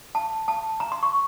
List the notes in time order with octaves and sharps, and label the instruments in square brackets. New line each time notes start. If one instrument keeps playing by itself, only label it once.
[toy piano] A5
A5
A#5
C6
C#6